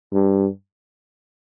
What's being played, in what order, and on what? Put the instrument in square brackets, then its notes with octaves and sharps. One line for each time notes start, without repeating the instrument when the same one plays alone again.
[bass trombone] G2